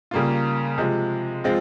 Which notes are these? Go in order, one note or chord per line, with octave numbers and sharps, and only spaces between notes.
C#3 G3 A#3 F4
C3 F3 G#3
F3 G#3 C4 F4